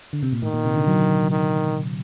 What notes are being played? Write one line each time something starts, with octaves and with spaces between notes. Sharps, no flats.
D3
C3
A#2
A2 D#3
A#2
C3
D3
F#3
D#3